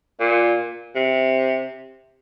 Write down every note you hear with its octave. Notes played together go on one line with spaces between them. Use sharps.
A#2
C3